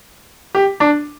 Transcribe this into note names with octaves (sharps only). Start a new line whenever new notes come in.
G4
D4